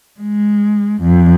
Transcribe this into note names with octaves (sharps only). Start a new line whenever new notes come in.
G#3
F2